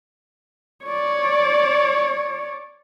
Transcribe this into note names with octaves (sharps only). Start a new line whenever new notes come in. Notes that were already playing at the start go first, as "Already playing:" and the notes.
C#5 D5